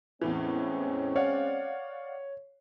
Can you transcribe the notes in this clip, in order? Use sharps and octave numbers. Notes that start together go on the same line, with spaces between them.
E2 A2 E3 G#3 C4 C#4
C#5 D5 F5 F#5